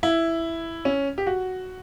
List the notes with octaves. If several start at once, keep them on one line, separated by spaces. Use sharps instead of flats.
E4
C#4
G4
F#4